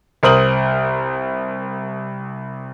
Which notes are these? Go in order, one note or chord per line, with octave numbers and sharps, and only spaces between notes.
C2 A#4 C5 D#6 F#7